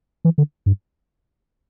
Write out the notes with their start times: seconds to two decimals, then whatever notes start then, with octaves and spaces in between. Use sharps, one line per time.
0.25 E3
0.38 D3
0.66 G2